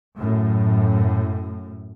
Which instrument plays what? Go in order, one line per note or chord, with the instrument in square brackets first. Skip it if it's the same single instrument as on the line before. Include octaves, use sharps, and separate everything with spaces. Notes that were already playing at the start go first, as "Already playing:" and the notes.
[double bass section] F#2 A2